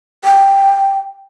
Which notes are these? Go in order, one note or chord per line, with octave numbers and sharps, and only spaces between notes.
G5